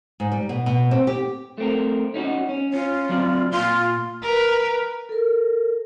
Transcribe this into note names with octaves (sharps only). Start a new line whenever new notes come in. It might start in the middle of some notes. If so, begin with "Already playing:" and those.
G#2
G3
B2
B2
C4
G4
A3 C4 A#4
C#4 D#4 F#4
C#4
C#4 F4
F#3 C4 D5
A#2 F4 C6
A#4 B4
A4 A#4